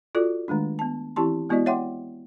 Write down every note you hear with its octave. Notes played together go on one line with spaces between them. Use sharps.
F4 F#4 A4 D5 D6
D#3 G#3 A3 D4
B3 A5
E3 C4 E4 G4 A5 C6
G#3 B3 E4 F#4 D5 D#5
C#5 E5 F#5 G5 C6 D6